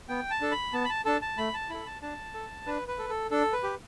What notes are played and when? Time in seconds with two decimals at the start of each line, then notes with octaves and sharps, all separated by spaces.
0.08 B3 G5
0.30 A5
0.41 D4 A4
0.52 B5
0.73 B3 A5
0.85 B5
0.89 A5
1.05 D4 A4 A5
1.22 A5
1.38 A3 B5
1.54 A5
1.70 E4 A4 B5
1.86 A5
2.02 D4 A5
2.34 A4
2.66 D4 B4
2.88 B4
2.99 A4
3.09 A4
3.31 D4 A4
3.53 B4
3.63 G4